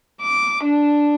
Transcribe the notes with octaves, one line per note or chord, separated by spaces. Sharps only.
D6
D4